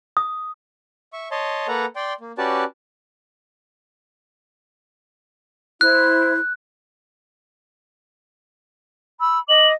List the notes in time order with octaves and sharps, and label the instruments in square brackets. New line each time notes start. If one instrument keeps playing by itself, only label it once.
[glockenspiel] D#6
[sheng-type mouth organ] E5 C#6
C#5 D#5 A5 C6
A#3 A4 B4 F#5 A#5
D5 G5 C6
A#3
C#4 F#4 G4 B4 D5 A5
[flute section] E4 C5 [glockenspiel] F#6
[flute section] B5 E6
[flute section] D#5 D6 [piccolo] F#7